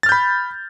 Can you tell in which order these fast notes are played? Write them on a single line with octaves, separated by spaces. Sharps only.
A6 F6 G6 B5